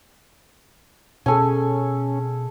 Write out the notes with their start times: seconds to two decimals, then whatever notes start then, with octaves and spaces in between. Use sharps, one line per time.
1.26 B2 C#4 G#4 A4 G#5